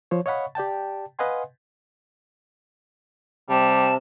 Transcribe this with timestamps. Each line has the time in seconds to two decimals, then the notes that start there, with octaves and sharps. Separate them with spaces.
0.11 F3 C5 C#5
0.26 C#5 D#5 F5 F#5 B5 C#6
0.55 G4 D5 G5 A5
1.19 B4 D#5 F5 F#5 G#5 C6
3.49 C3 G3 A5